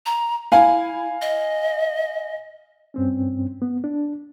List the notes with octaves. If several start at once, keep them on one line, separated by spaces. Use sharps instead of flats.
A#5
E4 F5 G#5
D#5
G2 C4 C#4
B3
D4